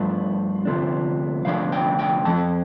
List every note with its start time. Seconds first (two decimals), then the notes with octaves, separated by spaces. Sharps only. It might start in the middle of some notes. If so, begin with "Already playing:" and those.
Already playing: G2 F3 A3 D4 F4
0.65 D2 C3 F3 A3 D4
1.45 D2 C3 F3 A3 D4 F5
1.72 G5
1.99 G5
2.25 F2 F3 C4 A5